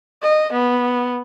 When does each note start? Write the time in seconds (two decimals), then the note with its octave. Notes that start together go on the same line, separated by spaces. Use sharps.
0.23 D#5
0.52 B3